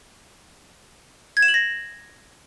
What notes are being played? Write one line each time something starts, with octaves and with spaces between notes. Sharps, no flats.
G#6
E7
F#7
A#6